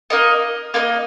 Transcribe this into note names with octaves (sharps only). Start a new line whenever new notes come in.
A#3 D#4 A#4 D#5
A#3 D#4 A#4 D#5